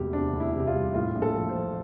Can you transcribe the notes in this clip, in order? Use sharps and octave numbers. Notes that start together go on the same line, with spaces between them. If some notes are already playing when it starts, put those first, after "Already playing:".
Already playing: E1 D2 C3 G4
C3 D4
D2
E4
C3
G4
F4
G3
A2 F4
A#1
A4
F3
C5
F3